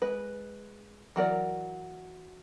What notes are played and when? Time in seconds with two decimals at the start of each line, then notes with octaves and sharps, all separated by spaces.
0.02 G#3 B4
1.16 E3 F#3 A#4 D5